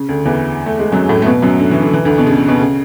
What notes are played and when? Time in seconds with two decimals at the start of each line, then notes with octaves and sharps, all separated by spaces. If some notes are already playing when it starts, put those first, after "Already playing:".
Already playing: C#3
0.08 D2 D3
0.25 E2 E3
0.66 A3
0.79 G#3
0.92 F#2 F#3
1.09 A2 A3
1.22 A3
1.26 B2 B3
1.42 F#2 F#3
1.59 D3
1.71 E3
1.82 D3
1.93 E3
2.05 D2 D3
2.18 B2
2.27 C#3
2.48 B2
2.60 C#3